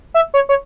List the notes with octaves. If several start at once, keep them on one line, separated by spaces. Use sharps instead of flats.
E5
C#5
C#5